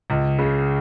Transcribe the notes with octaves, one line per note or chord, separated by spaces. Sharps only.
C#2
C#3